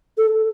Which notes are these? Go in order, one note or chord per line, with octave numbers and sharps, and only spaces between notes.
A4